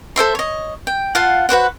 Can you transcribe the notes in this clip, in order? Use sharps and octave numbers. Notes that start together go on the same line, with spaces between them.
A4 C5 E5 C6
C#5 D#5
G5
F4 F5 F#5 A5
F#4 B4 C5 F#5